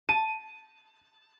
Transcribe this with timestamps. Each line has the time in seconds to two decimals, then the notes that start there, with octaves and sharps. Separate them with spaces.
0.09 A5 D#7